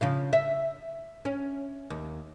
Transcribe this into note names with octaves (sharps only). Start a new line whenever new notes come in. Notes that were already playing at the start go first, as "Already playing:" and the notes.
C#3 F3 F5
E5
C#4
D#2